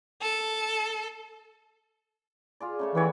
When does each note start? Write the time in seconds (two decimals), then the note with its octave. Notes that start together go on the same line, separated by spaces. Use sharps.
0.23 A4
2.60 F4 G#4 D5
2.79 C#3 A3 C#5
2.95 E3 B3 G4 C#5